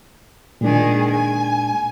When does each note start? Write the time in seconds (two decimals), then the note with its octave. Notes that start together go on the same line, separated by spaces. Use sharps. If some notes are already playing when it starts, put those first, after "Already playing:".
0.61 A#2 D#3 G#3 D4 G#4
1.09 G#5